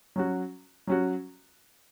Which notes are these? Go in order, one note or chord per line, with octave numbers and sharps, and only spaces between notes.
F#3 C#4 F#4
F#3 C#4 F#4